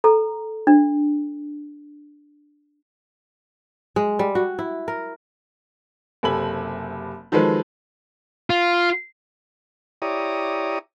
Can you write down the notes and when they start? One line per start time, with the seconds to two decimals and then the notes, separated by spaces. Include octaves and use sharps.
0.04 A4 A#5
0.67 D4
3.96 G#3
4.19 G3
4.35 F#4
4.59 E4
4.88 A#4
6.23 F#1 C3 A4 G#5 B5 F#7
7.32 D#3 F3 F#3 G#3 A4 B4
8.50 F4
10.02 E4 G4 C#5 D5 A#5 D#6